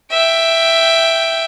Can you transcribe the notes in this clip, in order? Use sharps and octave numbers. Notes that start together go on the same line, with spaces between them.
E5 G5